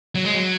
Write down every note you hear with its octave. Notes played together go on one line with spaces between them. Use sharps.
F#3
G#3
F#3